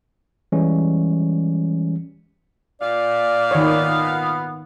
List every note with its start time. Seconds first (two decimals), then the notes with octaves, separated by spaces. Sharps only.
0.52 E3 G3 G#3 C#4
2.81 A#2 D5 F5
3.51 D#3 B3 C#5